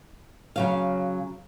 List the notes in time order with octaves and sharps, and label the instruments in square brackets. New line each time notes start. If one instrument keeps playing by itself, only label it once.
[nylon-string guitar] C#3 F#3 F5